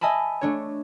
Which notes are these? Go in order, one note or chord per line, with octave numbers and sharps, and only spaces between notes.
D#5 E5 G#5 A5 B5
A3 D4 C#5